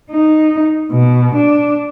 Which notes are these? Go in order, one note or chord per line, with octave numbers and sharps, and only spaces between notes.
D#4
B2
D4